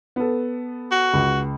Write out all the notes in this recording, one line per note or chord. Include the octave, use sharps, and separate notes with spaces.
B3 A4
F#4
C#2